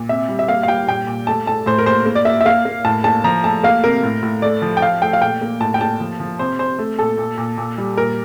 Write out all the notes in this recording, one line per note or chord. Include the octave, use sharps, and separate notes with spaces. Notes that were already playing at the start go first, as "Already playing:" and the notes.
Already playing: A#2
C3 E5
G3
E5
A#3 F5
F5
G3 G5
A#2 G5
A#2
A3 A5
A3 A5
A2 C5
A#4
A#3 C5
A#3
D5
A#3 E5
E5
A#3 F5
A#3
A2 A5
A#3 A5
F3 A#5
A3 A5
A#3 F5
C3 A#4
A2
A2
A3 D5
F3
G5
F3 F5
A3 G5
F5
A#2 G5
A#3
A2 A5
G5
A#3 A5
F3
F3
C3 C5
C3 C5
A3
A#2 A4
A#2
A#2
A#2
G3
A#2 A#4